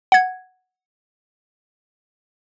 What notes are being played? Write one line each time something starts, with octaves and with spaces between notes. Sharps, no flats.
F#5 G#6